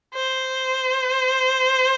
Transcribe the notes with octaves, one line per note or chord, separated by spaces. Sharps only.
C5